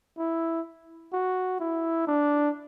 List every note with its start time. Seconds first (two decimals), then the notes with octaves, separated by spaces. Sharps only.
0.18 E4
1.13 F#4
1.60 E4
2.07 D4